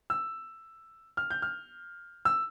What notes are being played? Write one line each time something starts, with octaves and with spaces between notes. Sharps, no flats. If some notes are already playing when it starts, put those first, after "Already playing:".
E6
F6
G6
F6
E6